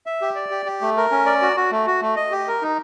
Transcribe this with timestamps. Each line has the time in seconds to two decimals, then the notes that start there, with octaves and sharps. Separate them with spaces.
0.06 E5
0.21 G4
0.35 D5
0.50 G4
0.66 G4
0.81 A3
0.97 A#4
1.11 C#4
1.26 D5
1.42 F#4
1.56 F#4
1.71 A3
1.87 F#4
2.01 A3
2.16 D#5
2.32 G4
2.48 A#4
2.62 D#4